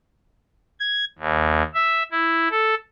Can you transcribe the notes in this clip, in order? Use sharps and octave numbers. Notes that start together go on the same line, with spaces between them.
G#6
D#2
E5
E4
A4